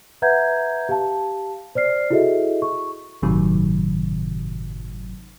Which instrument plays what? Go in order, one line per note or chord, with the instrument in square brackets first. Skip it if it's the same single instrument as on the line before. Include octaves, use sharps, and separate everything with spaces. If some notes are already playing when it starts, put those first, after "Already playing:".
[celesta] B4 E5 F#5 A#5 G6 G#6
G4 F5 A5
C5 D5 F6 C7
E4 F#4 G#4 A4 D#5 E5
C#6
[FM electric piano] G1 A2 C3 D#3 F#3